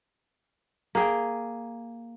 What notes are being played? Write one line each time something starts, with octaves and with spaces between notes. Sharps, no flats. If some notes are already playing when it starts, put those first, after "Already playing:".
A#3 G#4 G5